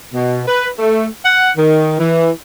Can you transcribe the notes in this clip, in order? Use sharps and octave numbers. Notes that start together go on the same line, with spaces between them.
B2
B4
A3
F#5
D#3
E3